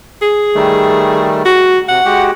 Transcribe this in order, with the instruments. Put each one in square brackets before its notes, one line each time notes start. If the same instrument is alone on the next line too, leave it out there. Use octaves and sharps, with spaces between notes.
[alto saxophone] G#4
[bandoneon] D#3 G3 A3
[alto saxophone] F#4
[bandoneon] C3 [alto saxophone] F#5
[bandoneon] G#3 F#4 G4